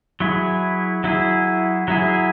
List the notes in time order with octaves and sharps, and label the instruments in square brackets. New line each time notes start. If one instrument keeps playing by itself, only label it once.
[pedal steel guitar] F#3 E4 G#4
F#3 E4 G#4
F#3 E4 G#4